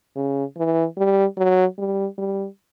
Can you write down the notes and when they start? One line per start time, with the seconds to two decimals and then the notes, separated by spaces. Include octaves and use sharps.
0.16 C#3
0.57 E3
0.97 G3
1.37 F#3
1.78 G3
2.18 G3